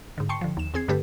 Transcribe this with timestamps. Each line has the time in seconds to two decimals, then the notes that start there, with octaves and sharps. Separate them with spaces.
0.18 G#2 D3
0.29 G5 A5 C6 C#6 C7 C#7
0.41 D3 F3
0.57 D#2 E7
0.74 E2 C4 G#4 G#6 C7
0.88 G2 D3 A3 G4 A4 B4